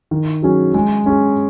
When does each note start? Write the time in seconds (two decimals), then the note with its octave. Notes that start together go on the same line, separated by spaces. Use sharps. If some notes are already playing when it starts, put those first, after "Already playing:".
0.11 D#3
0.42 F#3 C#4 G#4
0.74 G#3
1.06 C#4 G#4